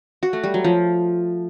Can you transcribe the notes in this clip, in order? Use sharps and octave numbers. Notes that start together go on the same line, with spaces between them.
F#4
A3
G3
F#3
F3